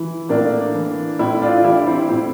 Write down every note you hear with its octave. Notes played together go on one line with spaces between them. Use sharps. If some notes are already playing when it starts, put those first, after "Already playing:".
Already playing: E3 E4
A2 A#3 D4
E3
A2 C4 E4
D4 F4
E3 E4 G4
C4 E4
A2 C4 E4